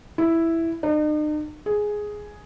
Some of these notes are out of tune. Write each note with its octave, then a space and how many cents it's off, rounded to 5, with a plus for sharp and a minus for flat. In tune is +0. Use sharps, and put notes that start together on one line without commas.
E4 +0
D#4 -45
G#4 +5